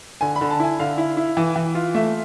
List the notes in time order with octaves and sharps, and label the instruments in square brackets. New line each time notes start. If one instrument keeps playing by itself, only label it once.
[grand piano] D3 G#5
B5
D3
A5
E4 G#5
D3 F5
E4
E4
E3
E3
F4
A3 E5